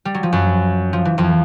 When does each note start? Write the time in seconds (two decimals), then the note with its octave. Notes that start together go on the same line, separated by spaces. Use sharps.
0.05 G3
0.14 F#3
0.23 F3
0.33 F#2 F#3
0.93 F3
1.05 E3
1.18 F2 F3